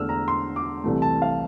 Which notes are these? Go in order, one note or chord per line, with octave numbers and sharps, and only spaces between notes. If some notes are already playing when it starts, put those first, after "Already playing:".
Already playing: E2 D3 A3 E6 F6
A#5
C6
D6
C2 C3 E3 A3
A5
F5